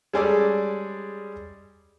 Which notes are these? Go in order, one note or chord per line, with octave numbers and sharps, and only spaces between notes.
G3 G#3 C#4 G#4 A4 D5